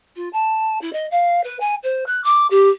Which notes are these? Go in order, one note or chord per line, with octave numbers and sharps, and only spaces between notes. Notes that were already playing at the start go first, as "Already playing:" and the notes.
F4
A5
E4
D#5
F5
B4
G#5
C5
F#6
D6
G4